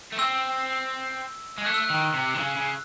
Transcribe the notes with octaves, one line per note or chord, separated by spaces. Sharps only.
A3
C4 E6
G#3
A3 F#6
E6
F#6
D#3
C3
D#3
C#3
C#3